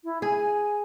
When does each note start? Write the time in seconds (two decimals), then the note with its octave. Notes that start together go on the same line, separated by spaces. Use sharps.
0.04 E4
0.22 G#4 G#5